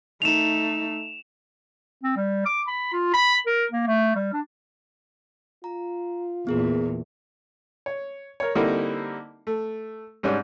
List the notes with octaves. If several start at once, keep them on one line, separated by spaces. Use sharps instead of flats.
A3 D#4 E7 F7
C4
G3
D6
B5
F4
B5
A#4
A#3
A3
G3
D4
F4 A#5
E2 A#2 B3 G#4 A#4
C#5
A#4 C#5
D3 G3 A#3 C4 D#4 E4
A3
G#2 G3 C#4 D4